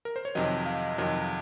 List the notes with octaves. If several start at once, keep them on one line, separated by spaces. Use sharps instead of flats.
A#4
C5
C#5
F2 C3 D#3 F#3 D#5
F5
F2 C3 D#3 F#3 D#5